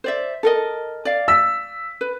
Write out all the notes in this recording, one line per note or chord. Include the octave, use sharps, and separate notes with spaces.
C5 D5 E5
A4 A#4 D#5
D5 F5
E6 B6
B4